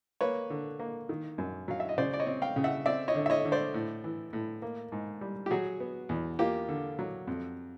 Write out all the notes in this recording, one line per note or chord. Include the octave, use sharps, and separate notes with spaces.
A#3 B4 C#5
D3
A#3
D#3
F#2
F#3 F5
E5
D#5
C#3 C5 D5
D5
C#5 D#5
C4
F5 G5
C#3
E5 F#5
C4 D5 E5
C#5 D#5
D3
E5
C#5 D#5
D3
C5 D5
A2
E3
A2
A#3
G#2
G3
G4
F#3 F#4 G#4
B3
E2
A#3 F4 G4
D3
F#3
F2